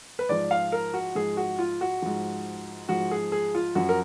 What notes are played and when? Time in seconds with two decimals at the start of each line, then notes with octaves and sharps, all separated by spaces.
0.19 B4
0.29 G#2 F3 D5
0.51 F5
0.72 A#4
0.94 F#4
1.15 G#2 F3 G#4
1.37 F#4
1.59 F4
1.81 F#4
2.02 G#2 F3
2.89 G#2 F3 F#4
3.11 G#4
3.32 G#4
3.55 F4
3.75 F#2 F3 F#4
3.89 A#4